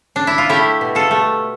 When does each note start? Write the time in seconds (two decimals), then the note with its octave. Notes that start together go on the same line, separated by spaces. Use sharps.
0.16 D4
0.27 E4
0.38 F4
0.49 A3 E4 G4
0.81 B2
0.95 F4 A4
1.11 A3